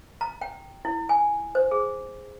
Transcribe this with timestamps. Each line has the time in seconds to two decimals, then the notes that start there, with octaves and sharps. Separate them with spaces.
0.21 A#5
0.41 G5
0.85 E4
1.09 G#5
1.55 C5
1.71 G#4